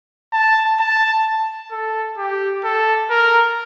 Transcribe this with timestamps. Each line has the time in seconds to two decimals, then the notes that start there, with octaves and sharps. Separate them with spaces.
0.33 A5
0.80 A5
1.72 A4
2.18 G4
2.64 A4
3.10 A#4